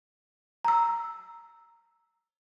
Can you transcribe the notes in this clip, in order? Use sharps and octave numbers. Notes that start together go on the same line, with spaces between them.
A#5 E6